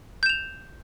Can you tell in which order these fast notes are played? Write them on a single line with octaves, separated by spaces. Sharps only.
G6 E7 F7